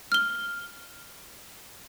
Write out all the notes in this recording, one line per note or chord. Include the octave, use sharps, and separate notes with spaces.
F6 G7